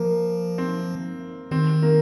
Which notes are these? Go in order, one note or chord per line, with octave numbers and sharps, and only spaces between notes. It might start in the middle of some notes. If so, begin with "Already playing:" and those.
Already playing: F3 A#3
C4
D#3 C4
A#3